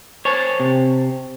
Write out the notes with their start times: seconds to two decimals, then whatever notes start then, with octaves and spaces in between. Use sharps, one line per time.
0.25 C5 C#5 G#5 A5
0.60 C3